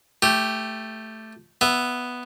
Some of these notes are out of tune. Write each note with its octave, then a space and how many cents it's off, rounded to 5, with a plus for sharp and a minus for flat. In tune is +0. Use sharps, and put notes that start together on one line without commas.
A3 +0 G4 +0
B3 +0 E5 +0